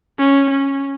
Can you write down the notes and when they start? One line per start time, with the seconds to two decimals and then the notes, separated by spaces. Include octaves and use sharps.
0.19 C#4
0.50 C#4